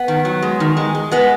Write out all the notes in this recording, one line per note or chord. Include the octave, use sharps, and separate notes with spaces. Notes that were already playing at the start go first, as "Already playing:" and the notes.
Already playing: B3
D#3
F#3
G#3
D#3
G#3
G#3
G#3 B3